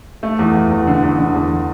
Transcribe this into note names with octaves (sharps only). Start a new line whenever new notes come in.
A3
E2
E2
E2
D3
E2
D3
E2